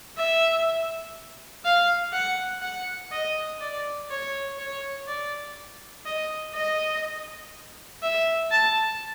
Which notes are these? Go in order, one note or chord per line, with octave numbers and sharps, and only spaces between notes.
E5
F5
F#5
F#5
D#5
D5
C#5
C#5
D5
D#5
D#5
E5
A5